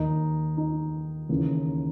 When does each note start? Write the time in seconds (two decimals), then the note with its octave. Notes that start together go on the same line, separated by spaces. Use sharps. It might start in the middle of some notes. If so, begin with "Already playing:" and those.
Already playing: D#2 D#3 D#4
0.57 D#4
1.29 D#2 C#3 E3